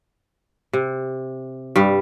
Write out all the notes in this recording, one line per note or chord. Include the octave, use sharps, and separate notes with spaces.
C3
G2 G3